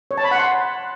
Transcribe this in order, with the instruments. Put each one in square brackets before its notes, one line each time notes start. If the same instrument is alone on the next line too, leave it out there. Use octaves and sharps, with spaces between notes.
[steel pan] C#5
A5
B5
F#5
C6